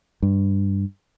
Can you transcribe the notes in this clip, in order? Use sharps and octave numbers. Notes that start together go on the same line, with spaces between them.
G2